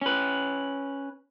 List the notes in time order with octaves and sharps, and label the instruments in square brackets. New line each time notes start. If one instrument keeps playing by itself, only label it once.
[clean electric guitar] C#4 B4